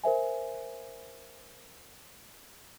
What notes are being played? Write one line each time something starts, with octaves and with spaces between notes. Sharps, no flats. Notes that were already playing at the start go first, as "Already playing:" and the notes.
A#4 C5 E5 G#5